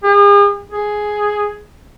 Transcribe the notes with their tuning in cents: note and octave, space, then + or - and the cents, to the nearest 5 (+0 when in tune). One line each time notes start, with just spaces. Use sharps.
G#4 -45
G#4 +5